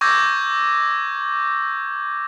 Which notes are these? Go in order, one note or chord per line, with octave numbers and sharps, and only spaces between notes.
C#6 D6 E6 G6 G#6 A#6